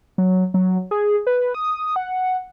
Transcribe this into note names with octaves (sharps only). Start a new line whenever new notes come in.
F#3
F#3
G#4
B4
D#6
F#5